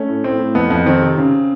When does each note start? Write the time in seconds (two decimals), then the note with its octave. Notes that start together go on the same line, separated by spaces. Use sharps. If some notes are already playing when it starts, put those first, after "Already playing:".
Already playing: A3 C#4
0.08 A2
0.24 A2 C4
0.39 A2
0.55 F2 B3
0.70 F2
0.86 D#3 C4
1.02 C3
1.18 C#3